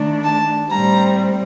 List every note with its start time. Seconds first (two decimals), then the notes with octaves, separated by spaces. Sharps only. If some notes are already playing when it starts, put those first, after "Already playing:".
Already playing: D#3 A3 D4
0.24 A5
0.70 A2 G3 C4 A#5